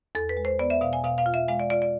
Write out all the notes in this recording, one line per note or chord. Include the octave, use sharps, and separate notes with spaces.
E2 A4
B4
G#3
C5
B3 D5
E5
B2 F5
G#5
B2 F5
F5
F4
E5
G#3 F5
D5
F4 D5
D5